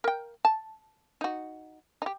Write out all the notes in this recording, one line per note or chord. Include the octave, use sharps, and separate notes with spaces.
A#4 G5
A5
D#4 F#4
D#4 G4